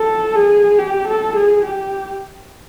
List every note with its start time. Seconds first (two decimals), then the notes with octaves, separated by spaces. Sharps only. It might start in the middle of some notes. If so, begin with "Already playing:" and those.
Already playing: A4
0.35 G#4
0.79 G4
1.07 A4
1.36 G#4
1.65 G4